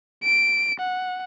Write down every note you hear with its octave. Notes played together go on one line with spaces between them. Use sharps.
D7
F#5